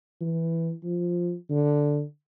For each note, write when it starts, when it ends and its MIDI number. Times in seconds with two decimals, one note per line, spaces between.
0.21 0.72 52
0.83 1.34 53
1.50 2.03 50